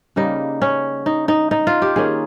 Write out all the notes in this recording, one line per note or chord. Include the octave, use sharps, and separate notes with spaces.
C#3 G3 A#3 D#4
C#4
D#4
D#4
D#4
F4
G4
D#3 A#3 C#4 G#4